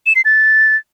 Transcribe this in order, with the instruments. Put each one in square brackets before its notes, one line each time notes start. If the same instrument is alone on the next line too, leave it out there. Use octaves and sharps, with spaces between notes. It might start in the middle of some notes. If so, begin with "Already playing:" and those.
[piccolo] E7
C7
A6